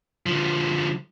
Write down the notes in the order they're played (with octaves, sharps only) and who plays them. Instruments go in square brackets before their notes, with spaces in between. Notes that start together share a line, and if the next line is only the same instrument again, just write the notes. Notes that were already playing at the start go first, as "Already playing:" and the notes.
[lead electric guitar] D3 F3